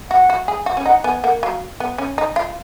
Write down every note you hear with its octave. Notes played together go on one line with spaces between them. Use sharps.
F#4 F#5
F#4
G#4
F#4
C#4
D#4 F#5
B3 G#5
A#3 F#5
F#3 F5
B3
C#4
D#4
F4